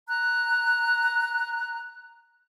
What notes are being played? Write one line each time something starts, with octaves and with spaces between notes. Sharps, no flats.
A#5 F#6